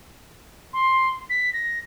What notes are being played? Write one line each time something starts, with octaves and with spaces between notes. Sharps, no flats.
C6
B6
A#6